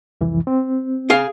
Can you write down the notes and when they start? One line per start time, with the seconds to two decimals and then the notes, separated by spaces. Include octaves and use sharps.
0.21 C2 F2 E3
0.47 C4
1.10 G#4 F5